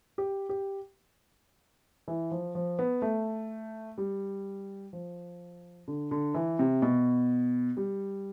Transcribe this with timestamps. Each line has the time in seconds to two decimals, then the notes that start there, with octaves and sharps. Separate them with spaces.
0.18 G4
0.49 G4
2.08 E3
2.31 F3
2.55 F3
2.79 B3
3.02 A3
3.98 G3
4.93 F3
5.88 D3
6.11 D3
6.34 E3
6.59 C3
6.82 B2
7.77 G3